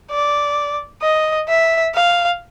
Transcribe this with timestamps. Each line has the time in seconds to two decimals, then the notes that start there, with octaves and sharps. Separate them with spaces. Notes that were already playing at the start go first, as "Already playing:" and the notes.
0.11 D5
1.03 D#5
1.49 E5
1.95 F5